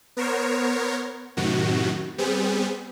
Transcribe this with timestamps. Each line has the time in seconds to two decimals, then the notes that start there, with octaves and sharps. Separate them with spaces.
0.17 B3 A#4 C5 C#5
1.37 F#2 A2 C3 D#3 F#4
2.18 G3 B3 C4 G#4